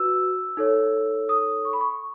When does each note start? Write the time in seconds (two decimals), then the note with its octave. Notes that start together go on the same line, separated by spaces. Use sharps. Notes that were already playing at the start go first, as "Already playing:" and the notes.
Already playing: F#4 B4 E6
0.57 D#4 A4 C#5
1.29 D#6
1.65 C#6
1.73 B5
1.81 C#6